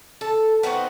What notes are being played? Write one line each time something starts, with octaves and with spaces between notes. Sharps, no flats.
A4
B3 C4 D#4 F#4